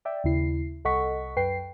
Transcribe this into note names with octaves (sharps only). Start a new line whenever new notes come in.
D5 E5 G5
D#2 C#3 E4 C7
C2 A4 D#5 F#5 C#6 B6
F#2 B4 G5 C7